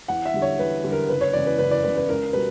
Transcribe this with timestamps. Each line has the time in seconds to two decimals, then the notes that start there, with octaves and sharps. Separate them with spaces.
0.08 E2 F#5
0.25 E5
0.34 D3 G3
0.42 C#5
0.59 E2 B4
0.84 D3 G3
0.92 A#4
1.09 F#1 B4
1.21 C#5
1.33 E2 C#3 E3 D5
1.46 B4
1.59 F#1 B4
1.71 D5
1.84 E2 C#3 E3 B4
1.97 B4
2.08 C#2 A#4
2.33 B2 G3 B4